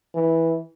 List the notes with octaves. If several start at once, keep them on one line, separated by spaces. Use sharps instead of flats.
E3